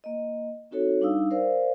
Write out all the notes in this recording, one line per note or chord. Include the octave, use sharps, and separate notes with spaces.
A#3 D#5
C4 D#4 F#4 A4 C#5
G3 D4 D#4 F5 D#6 E6
A#4 C5 D5 F5